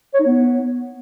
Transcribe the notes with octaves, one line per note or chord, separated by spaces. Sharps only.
C#5
D#4
B3